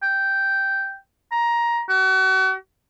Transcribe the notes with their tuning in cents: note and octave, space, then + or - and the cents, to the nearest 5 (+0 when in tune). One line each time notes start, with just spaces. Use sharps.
G5 -5
A#5 +15
F#4 +40